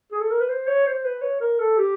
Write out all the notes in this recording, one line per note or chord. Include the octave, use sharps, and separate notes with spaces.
G#4
A4
A#4
B4
C5
C#5
C5
B4
C#5
A#4
A4
G4